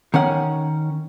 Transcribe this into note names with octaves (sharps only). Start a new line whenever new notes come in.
D#3 C#4 F#5